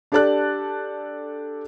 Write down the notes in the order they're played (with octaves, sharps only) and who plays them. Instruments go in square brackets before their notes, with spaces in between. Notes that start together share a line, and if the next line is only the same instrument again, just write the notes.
[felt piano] D4 G4 A4 D5 A5 F#6